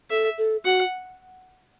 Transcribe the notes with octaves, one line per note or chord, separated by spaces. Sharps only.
A4 E5
A4
F#4 F#5